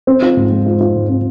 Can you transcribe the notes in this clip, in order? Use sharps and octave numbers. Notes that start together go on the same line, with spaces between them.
C4
F4
G#2
G#3
F4
F4
G#2
C4